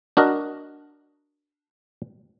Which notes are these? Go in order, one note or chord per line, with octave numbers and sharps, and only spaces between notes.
D4 F#4 A#4 D#5